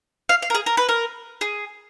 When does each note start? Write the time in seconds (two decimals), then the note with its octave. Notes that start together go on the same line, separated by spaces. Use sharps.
0.29 F5
0.42 F5
0.50 A#4
0.55 G#4
0.66 A#4
0.77 B4
0.89 A#4
1.41 G#4